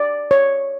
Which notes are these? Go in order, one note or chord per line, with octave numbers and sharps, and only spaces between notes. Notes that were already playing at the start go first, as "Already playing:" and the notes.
Already playing: D5
C#5